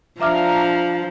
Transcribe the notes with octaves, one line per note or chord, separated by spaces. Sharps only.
F3 D4 E5 F5 A#5 D6 F6